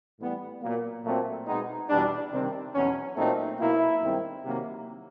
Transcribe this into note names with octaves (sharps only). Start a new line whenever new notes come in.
A2 E3 G3 B3
A#2 F#3 A#3
A#2 F#3 A3 C4
B2 G#3 B3 D#4
E2 B2 G3 D4
C3 D#3 G3 C4
E2 B2 F#3 C#4
A#2 F#3 A3 C4 D#4
B2 F#3 A#3 E4
G2 D#3 G#3 C4
C3 D#3 F#3 A#3